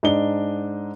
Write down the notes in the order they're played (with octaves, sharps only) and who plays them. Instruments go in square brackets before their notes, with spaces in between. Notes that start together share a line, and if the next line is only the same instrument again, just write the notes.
[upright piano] G#2 D4 D#5 G7